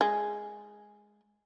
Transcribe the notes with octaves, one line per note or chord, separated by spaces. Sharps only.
G#3